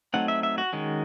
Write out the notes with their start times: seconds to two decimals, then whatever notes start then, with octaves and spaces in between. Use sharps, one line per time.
0.14 F#3 A3 C4 D#4 F#5
0.28 E5
0.43 E5
0.58 F#4
0.73 D#3 G#3 C#4